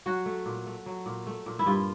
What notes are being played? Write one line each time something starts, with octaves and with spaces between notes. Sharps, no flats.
F#3 F#4
A3
A#2
A3
F#3
A#2
A3
A#2
E4
G2 F4